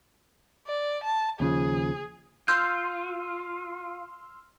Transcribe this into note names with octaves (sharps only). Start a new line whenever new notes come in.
D5
A5
D#2 C#3 F3 G#4
F4 C6 E6 F6 G6